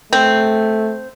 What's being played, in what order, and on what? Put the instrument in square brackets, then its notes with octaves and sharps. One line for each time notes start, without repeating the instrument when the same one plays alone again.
[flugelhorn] A3 [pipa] C4